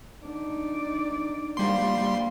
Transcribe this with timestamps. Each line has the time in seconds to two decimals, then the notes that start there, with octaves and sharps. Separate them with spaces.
0.25 D4 D#4 D5
1.57 A#2 F3 G3 A#3 C6